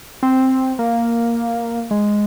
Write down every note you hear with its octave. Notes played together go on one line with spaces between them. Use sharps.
C4
A#3
G#3